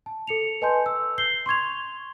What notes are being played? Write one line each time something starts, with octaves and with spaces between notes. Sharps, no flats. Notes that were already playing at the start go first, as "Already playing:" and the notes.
A5
A4 C#7 F7
B4 D#5 G#5 A5 C6 G6
E6
G6 C7 G7
C6 C#6 G#6 F7